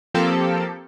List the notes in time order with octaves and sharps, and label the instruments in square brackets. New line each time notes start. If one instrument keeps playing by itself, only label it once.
[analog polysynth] F3 A#3 C4 G4 A4